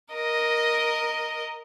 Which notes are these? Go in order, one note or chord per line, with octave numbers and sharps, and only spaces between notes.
A#4 D#5